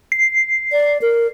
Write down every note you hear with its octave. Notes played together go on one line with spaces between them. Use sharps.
C7
D5
A#4